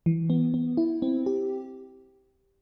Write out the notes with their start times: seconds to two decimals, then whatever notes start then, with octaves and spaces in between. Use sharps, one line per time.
0.06 E3
0.30 B3
0.54 B3
0.77 E4
1.02 C4
1.26 G4